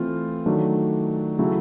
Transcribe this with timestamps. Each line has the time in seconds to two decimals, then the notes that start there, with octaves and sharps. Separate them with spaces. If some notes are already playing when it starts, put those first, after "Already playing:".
Already playing: E3 A3 C4 F4
0.46 D#3 F#3 A3 D4
1.39 C#3 F#3 A3 C#4 E4